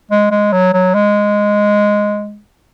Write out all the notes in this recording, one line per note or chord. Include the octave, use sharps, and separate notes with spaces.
G#3
G#3
F#3
F#3
G#3